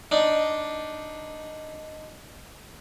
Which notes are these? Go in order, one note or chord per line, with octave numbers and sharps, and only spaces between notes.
D4 D#4